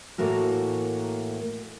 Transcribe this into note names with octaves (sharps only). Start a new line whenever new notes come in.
A2 E3 A#3 F#4 A#4